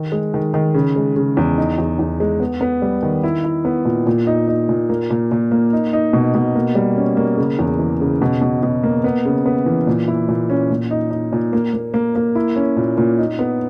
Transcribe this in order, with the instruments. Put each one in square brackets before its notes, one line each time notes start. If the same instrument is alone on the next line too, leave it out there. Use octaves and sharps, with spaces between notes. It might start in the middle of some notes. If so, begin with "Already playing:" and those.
Already playing: [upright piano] D#3
G#3
D#3
D#3
C#3
G#3
C#3
E2
D#4
E2
E2
G#3
B3
B3
G3
D#3
E4
E4
B3
A#2
A#2
D#4
D#4
A#2
A#3
A#2
A#2
A#3
D#4
D#4
B2
B2
A#3
G3
C#4
A#3
C#3
E2
E3
C#3
B2
B2
B2
A#3
B3
C#3
B3
E3
A#2
E4
A#2
C#4
A#2
D#4
D#4
A#2
A#3
A#3
A#3
A#3
E4
C#4
A#2
A#2
D#4
B3